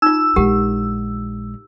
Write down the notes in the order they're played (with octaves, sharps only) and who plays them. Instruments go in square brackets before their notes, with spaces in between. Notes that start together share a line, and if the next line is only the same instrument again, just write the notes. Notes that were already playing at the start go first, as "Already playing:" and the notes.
[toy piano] D#4 F4 [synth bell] E6
[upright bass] A#1 G#3 [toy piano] G4 A#4 F#5